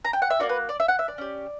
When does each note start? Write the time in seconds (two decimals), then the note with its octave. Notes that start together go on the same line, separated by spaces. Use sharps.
0.05 A#5
0.13 G5
0.22 F#5
0.30 E5
0.40 A#3 D4 F#4 D5
0.49 B4
0.69 D5
0.80 E5
0.88 F#5
0.99 E5
1.08 D5
1.18 C#4 G4